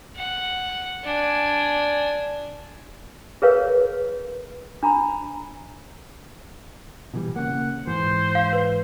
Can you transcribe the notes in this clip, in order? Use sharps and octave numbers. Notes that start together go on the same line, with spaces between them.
F#5
D4 G#5
G#4 A#4 B4 C#5 F5
D4 A#5 B5
B2 E3 G3
C#3 A#3 F#5
G#2 E3 C5
F5
B4